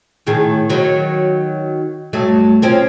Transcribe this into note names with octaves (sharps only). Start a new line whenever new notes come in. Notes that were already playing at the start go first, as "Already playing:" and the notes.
A2 D#3 G#4
D#3 F#3
G2 F#3 A3
F3 C4 C#4